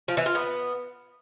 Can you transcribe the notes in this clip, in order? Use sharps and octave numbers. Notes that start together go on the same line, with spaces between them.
F3
E3
F4
B3